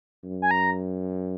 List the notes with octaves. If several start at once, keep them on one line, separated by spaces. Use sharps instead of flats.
F#2
G#5
A#5